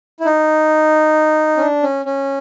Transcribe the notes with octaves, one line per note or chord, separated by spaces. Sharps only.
E4
D#4
C#4
D4
C#4
C#4